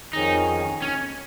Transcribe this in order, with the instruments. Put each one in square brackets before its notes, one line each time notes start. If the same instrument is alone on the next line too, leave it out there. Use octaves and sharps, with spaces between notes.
[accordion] F2 D#3 C#4 G#4 [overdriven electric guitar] D#4
[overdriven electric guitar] C#4